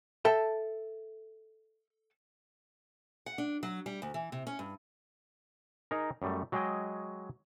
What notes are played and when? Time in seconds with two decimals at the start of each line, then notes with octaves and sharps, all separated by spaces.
0.25 A4 E5 G5
3.26 F#5
3.38 D4
3.63 F#3
3.86 G3
4.02 D2
4.14 E3
4.32 C3
4.47 C#4
4.59 G2
5.91 D#4 G#4 A#4
6.22 F#2 G3 A3
6.52 F#3 G#3 G#4 D#5 G5